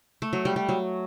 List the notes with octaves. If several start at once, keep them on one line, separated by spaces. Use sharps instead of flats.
A3
F#3
G3
G3
F#3